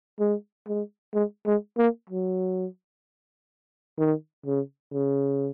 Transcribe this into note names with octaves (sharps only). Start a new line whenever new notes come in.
G#3
G#3
G#3
G#3
A#3
F#3
D#3
C#3
C#3